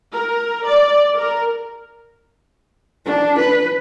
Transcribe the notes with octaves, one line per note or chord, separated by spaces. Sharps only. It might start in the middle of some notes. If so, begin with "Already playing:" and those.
A#4
D5
A#4
D4
B4